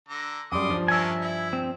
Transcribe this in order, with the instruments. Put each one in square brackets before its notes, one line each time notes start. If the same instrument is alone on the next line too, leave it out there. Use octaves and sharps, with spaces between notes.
[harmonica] D3 A#5
[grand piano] F#2 G3 [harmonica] C6 D6 D#6
[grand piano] G2 F3
[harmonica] C#4 D4 A#4 [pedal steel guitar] E5 G#5
[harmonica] E4
[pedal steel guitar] C4